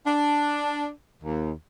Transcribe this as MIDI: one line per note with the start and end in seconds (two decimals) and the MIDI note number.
0.06 0.89 62
1.23 1.51 39